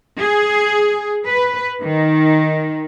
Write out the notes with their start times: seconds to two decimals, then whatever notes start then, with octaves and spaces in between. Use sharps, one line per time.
0.19 G#4
1.27 B4
1.81 D#3